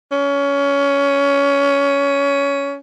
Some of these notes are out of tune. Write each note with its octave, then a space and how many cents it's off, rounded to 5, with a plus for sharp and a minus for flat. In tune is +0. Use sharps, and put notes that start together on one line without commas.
C#4 +20